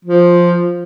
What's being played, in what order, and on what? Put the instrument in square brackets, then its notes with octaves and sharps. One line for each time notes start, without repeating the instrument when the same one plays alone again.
[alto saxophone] F3